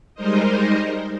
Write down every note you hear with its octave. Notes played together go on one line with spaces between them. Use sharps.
G3 G#3 D#4 A#4 C5 D#5